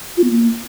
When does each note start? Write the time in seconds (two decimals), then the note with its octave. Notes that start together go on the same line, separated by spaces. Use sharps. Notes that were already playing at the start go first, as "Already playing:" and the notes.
0.17 F4
0.24 B3
0.30 A#3